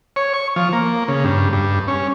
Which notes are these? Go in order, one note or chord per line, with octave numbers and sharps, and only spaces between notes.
C#5
C#6
F3
A#3
C#3
G2
G2
C#4